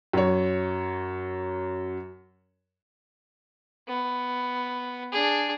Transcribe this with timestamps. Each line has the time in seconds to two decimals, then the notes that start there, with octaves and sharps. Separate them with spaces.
0.13 F#2 C#5
3.88 B3
5.12 D4 G#4